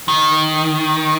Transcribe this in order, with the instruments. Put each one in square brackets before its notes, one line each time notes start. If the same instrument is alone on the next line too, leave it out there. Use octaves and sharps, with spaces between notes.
[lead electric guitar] D#3